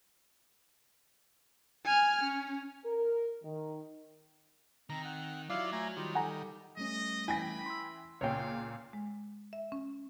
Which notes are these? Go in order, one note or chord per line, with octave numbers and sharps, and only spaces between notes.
G#5 F6
C#4
A#4
D#3
D#3 C4 A#5
F#5
F#3 E4 F4 D5 F5
A3 G#5 A#5
D#3 G3 F4
A4 F#5 G#5 A#5
G3 A3 C#4 D#5
E3 G5 G#5 B5 A#6
C6 E6
C#2 A#2 C#5 F5 G5
G#3
E5
C#4